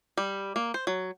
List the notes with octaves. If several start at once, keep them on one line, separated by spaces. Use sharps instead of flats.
G3
A#3
C5
F#3